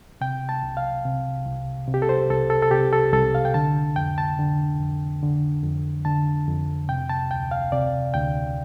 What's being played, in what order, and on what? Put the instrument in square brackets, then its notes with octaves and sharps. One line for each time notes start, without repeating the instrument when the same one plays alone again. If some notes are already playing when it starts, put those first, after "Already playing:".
[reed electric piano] C3 G5
A5
C2
F5
C3
C2
C3
G4
A4
C5
C2 A4
A4
A4
C3 G4
A4
C2 A4
F5
G5
D3 A5
F2 G5
A5
D3
F2
D3
F2
D3 A5
F2
C3 G5
A5
D2 G5
F5
C3 D5
D2 G5